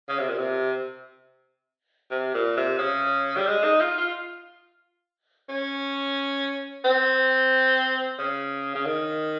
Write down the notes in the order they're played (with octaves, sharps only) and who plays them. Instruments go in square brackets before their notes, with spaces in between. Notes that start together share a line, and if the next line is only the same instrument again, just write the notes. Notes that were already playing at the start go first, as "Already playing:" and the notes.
[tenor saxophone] C#3
C3
A#2
C3
C3
A#2
C3
C#3
G3
G#3
D#4
F4
F4
C#4
C4
C#3
C#3
D#3